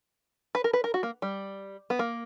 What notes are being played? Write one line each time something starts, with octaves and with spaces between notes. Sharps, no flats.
B4
A#4
B4
A#4
F#4
A#3
G3
B3
A#3